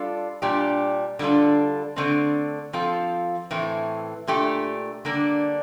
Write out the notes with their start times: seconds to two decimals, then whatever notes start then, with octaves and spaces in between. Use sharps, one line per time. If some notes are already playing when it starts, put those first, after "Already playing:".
Already playing: G3 D4 F4 A4
0.42 A#2 G3 D4 G4
1.19 D3 G3 D4 F4 A4
1.96 D3 A3 C4
2.73 F3 C4 F4 A4
3.51 A2 E3 A3 C4
4.27 A#2 A3 D4 G4
5.05 D3 G3 A#3 D4